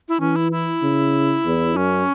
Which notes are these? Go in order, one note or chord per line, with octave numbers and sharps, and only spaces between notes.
E4
E3 C#4
E4
E4
C#3
E2
F#2 C#4